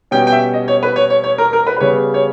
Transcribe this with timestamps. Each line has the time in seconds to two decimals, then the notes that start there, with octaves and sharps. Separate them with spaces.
0.11 B2 G3 C#4 G5
0.27 G5
0.33 E5
0.54 D#5
0.68 C#5
0.83 B4
0.96 C#5
1.10 C#5
1.24 C#5
1.38 A#4
1.53 A#4
1.66 B4
1.77 B4
1.80 C#3 G3 B3 C#5
2.14 C#5